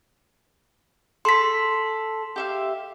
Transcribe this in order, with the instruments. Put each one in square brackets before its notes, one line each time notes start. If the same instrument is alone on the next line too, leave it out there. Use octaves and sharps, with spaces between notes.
[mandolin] A4 [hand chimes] C6 B6
[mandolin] G4 E5 F5